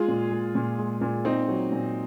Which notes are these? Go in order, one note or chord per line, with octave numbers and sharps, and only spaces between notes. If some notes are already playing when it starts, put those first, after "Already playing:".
Already playing: G#3 F4 G#4
A#2
G#3
A#2
G#3
A#2
A#2 C4 D#4
F#3
A#2